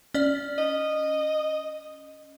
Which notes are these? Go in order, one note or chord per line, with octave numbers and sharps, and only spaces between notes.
C#4 D5
D#5